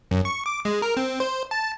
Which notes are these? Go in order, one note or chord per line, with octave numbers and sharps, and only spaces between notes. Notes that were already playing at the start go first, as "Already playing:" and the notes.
F#2
C#6
D6
G#3
A#4
C4
C5
A5